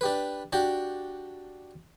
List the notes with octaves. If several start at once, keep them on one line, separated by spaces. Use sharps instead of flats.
D4 G4 B4
D4 F#4 G4 G5